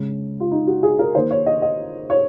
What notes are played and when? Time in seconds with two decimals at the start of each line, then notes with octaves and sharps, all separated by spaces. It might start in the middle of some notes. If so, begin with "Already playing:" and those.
Already playing: C#3 G#3
0.40 F4
0.51 D#4
0.67 F#4
0.83 G#4
0.99 A#4
1.15 D#3 A#3 C5
1.31 C#5
1.46 D#5
1.62 D#5
2.10 C#5